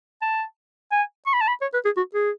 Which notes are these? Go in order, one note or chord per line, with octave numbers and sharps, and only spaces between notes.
A5
G#5
C#6
B5
A5
B5
C#5
B4
G#4
F#4
G#4